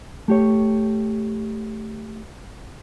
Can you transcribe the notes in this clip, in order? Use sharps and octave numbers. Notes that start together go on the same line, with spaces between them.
A3 G4 C#5